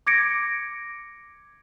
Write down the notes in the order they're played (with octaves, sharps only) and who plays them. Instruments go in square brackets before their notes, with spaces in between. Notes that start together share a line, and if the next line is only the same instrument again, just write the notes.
[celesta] D6 G#6 A#6 C#7 D7